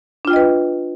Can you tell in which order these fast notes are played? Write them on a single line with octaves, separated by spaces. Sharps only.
D4 F4 G5 D#5 B4